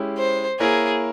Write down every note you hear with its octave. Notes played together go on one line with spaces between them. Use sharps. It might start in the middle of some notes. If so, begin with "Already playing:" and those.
Already playing: G#3 C#4 E4 G4
C5
A#3 E4 G#4 A#4 C#5